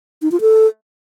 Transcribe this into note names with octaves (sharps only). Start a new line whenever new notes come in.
D#4
F4
A4